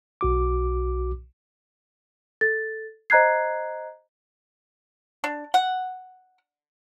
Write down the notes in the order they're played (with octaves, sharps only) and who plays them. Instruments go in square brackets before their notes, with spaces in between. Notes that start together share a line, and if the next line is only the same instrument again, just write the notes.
[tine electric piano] B1 F#4 D6
[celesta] A4 A6
C5 D#5 A#5 F#6 G#6 C7
[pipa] D4
F#5